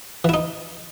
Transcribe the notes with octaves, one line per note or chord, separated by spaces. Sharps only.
E3 D#4 E4